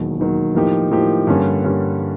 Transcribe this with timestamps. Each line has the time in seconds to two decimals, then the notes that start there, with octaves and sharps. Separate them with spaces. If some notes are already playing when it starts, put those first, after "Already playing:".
Already playing: E1 D#2 D#3 F#3
0.17 E1 D#2 D#3 F#3
0.54 A2 F3 A#3 D#4 G4
0.91 A2 F3 A#3 D#4 G4
1.27 G2 D3 G3 A#3 C#4
1.64 G2 D3 G3 A#3 C#4